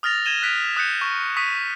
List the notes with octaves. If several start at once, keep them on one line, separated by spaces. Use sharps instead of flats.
D#6 F6 A6 A#6 F7
G#6 A#6 D#7 E7 G7
F#6 B6 D7 F7
D#6 F#6 G6 C#7
C#6
C#6 D#6 B6 D#7